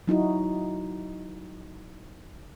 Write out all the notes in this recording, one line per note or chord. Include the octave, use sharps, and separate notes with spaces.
F#3 D#4 E4 F#4